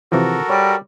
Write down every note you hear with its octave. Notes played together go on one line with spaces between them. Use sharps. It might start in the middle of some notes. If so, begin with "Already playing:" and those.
C3 E3 F3 F#4 A4 A#4
G3 C#5